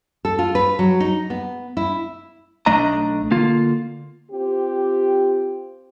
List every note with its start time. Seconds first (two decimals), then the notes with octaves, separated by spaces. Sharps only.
0.25 A4
0.39 F4
0.55 B4
0.79 F#3
1.00 D#4
1.30 B3
1.77 E4
2.66 B1 A3 D4 D#5 A#5
3.31 D3 A#3 F4
4.31 C4 F4 G4